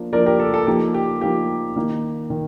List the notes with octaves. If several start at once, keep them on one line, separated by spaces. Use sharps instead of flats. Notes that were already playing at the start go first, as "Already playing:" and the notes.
Already playing: F3 A#3 D4
F3 A#3 D4 A#4 D5
G4 A#4
A4
A4
F3 A#3 D#4 G4
G4
F3 A#3 D#4 G4
D#3 A#3 D#4
D#3